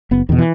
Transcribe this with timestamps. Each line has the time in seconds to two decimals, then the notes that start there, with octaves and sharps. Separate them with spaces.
0.11 F#1 B3
0.29 E2 B2 D#3
0.39 E3